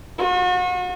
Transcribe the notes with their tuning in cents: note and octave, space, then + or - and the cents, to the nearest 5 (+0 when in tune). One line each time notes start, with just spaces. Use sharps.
F#4 -40